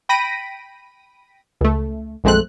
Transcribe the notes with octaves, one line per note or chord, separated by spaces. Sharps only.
G5 B5 A#6 B6 D7 D#7
C#2 A3
A#1 F#2 G#3 A3 C4 F#6